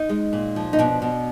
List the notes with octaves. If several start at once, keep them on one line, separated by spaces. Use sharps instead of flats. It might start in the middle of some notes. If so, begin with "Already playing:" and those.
Already playing: D#4
G#3
A#2
F3
D#4
B2 D4
B2